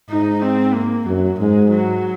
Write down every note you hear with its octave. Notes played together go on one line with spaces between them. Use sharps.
G#2 D#4
C4
A#3
F#2 F#3
G#2 G#3
F#3